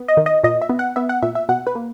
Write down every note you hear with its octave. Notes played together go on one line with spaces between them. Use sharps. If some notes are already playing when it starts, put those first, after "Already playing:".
Already playing: B3
D#5
D#3
D#5
A#2 D#5
E5
B3
F#5
B3 E5
F#5
A#2 E5
E5
B2 F#5
B4
A#3